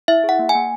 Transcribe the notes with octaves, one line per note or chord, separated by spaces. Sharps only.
E4 E5
G#4
F#5
A#3
G#5
A#3